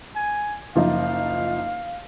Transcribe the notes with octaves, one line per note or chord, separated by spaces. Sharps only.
G#5
F#1 F3 D#4 F5